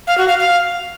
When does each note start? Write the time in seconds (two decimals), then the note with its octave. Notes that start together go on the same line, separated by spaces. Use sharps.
0.07 F5
0.18 F#4
0.28 F5
0.39 F5